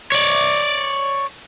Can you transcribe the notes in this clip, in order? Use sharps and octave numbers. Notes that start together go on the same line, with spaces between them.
C#5 D5